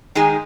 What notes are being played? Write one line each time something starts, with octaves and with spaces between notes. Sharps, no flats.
D#3 G#3 D#4 G#4